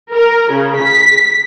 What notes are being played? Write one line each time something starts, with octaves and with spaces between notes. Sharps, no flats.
A#4
C#3
B6